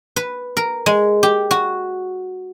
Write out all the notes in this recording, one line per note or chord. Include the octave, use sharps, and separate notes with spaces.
B4
A#4
G#3
G4
F#4